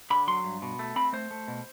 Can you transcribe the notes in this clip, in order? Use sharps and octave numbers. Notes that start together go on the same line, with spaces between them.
D3 B5
F#3 C6
G2
B2
A3
C4 B5
A3 C5
A3
B2